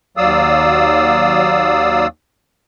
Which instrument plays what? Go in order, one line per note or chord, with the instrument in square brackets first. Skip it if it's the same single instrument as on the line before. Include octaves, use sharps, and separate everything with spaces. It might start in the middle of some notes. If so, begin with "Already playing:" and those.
[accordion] D#2 F#3 D5 F5 D#6 E6